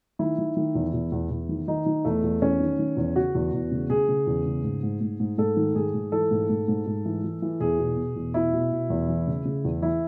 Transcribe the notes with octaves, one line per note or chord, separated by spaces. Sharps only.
D#3 E4
D#3
D#3
E2
E2
E2
E2
D#3
D#3 D#4
D#3
E2 A3
E2
E2 C#4
D#3
D#3
E2
C#3 F#4
E2
E2
C#3
C#3 G#4
C#3
E2
C#3
G#2
G#2
G#2
G#2
G#2 A4
D#3
G#2 G#4
G#2
E3 A4
G#2
G#2
G#2
G#2
E3
E3
E3
E2 G#4
B2
B2
E2
B2 E4
B2
B2
E2
E3
C#3
C#3
E2
E3 E4